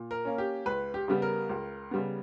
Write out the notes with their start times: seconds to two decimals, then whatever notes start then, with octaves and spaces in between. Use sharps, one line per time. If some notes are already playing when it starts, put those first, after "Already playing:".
Already playing: A#2
0.11 A#4
0.25 A#3 C#4
0.38 G4
0.66 C#2 B4
0.94 G4
1.08 C#3 G3 B3
1.22 A#4
1.49 C#2
1.91 C#3 G3 B3